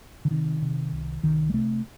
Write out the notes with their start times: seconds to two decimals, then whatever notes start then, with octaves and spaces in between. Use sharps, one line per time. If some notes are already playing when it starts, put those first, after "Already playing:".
0.25 D3
0.31 C3 D#3
0.62 C3
0.92 C2
1.23 C2 D#3
1.49 G#3
1.54 C3 A3